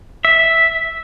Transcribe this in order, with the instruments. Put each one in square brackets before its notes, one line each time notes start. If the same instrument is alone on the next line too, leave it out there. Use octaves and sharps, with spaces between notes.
[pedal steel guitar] E5